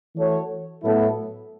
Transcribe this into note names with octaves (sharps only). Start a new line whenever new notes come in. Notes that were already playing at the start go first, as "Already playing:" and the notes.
E3 A3 F#4 A4 C#5
A2 F#3 B3 E4 A4